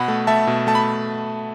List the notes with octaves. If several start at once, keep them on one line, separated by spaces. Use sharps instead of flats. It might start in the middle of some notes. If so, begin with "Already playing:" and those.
Already playing: B2 F#5 B5
A3
A3 E5 A5
B2
A3 A5
B5